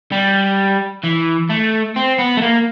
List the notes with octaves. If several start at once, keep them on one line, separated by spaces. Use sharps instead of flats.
G3
E3
A3
C4
B3
A3
A#3